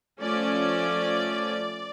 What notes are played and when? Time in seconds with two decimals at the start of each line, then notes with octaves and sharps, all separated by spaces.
0.21 F3 A3 C#4 D5